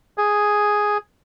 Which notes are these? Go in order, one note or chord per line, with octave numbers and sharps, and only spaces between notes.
G#4